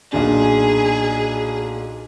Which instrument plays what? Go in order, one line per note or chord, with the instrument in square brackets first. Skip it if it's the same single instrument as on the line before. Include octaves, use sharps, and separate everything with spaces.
[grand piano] B1 A#2 D4 [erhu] G#4